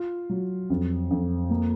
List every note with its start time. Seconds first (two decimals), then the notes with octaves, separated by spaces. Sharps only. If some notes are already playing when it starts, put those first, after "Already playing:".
Already playing: F4
0.30 F#3
0.70 F2
1.11 F2
1.50 A#3